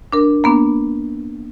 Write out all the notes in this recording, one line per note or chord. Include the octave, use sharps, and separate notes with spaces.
D4 A#4
A#3 B3 D4